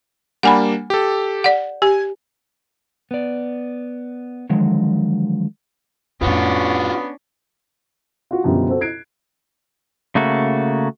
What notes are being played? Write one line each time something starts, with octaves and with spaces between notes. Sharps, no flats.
G3 A#3 D4 F#5 G#5 B5
G4 A4
D5 F#5
G4 G#5
B3 D5
D3 D#3 F3 F#3 G#3
F2 A2 B3 C#4 D4 F4 F#4
F4 F#4
F#2 B2 D3 F3 G3
C4 F#4 A4 C5
F#6 G#6 C7 D7
C#3 A3 A#3 F#4